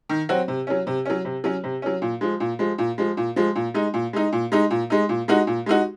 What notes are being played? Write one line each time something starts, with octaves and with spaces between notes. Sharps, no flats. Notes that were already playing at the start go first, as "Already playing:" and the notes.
D#3
F#3 C4 F#4
C3
F#3 C#4
C3
F#3 C#4
C3
F#3 C#4
C3
F#3 C#4
A#2
F3 G#3
A#2
F3 G#3
A#2
F3 G#3
A#2
F3 G#3
A#2
G#3 D#4
A#2
G#3 D#4
A#2
G#3 D#4
A#2
G#3 D#4
A#2
G#3 D#4 F#4
A#2
G#3 D#4 F#4